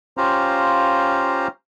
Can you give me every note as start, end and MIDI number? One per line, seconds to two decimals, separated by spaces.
0.17 1.47 61
0.17 1.47 65
0.17 1.47 67
0.17 1.47 72
0.17 1.47 77
0.17 1.47 82